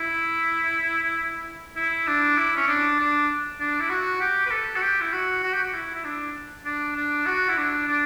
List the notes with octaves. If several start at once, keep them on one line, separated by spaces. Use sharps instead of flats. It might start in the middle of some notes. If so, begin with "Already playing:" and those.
Already playing: E4
E4
D4
E4
C#4
D4
D4
D4
E4
F#4
G4
B4
A4
F#4
G4
E4
F#4
F#4
G4
F#4
E4
E4
D4
D4
D4
F#4
E4
D4
D4